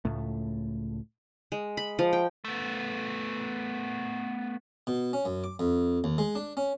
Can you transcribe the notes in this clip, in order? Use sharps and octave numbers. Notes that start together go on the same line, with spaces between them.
C#2 A2 A3
G#3
B5
F3
G5
A3 B3
B2
C#4
F#2
D6
F2
D#2
G#3
D4
C#4